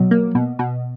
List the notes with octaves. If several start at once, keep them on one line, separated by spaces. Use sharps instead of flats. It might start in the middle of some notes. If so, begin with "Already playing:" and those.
Already playing: B2 F#3
A#3
B2
B2